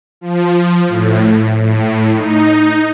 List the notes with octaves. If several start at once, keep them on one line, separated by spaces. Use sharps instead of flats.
F3
A2
A2
D#4